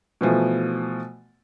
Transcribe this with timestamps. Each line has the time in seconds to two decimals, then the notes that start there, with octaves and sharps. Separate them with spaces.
0.21 B2 E3 F3 A3